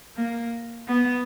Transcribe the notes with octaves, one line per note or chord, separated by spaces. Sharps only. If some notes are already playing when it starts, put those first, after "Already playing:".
A#3
B3